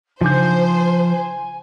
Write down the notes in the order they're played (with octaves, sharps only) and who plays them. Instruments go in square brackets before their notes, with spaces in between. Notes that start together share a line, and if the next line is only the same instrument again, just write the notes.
[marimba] C#3 D4 D#4 [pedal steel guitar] F3 G6 [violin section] C5 [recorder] G#5